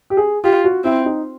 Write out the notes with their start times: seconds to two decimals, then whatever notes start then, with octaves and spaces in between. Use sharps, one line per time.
0.10 G4
0.17 G#4
0.44 F4 G4
0.64 F#4
0.84 C4 E4
1.06 D#4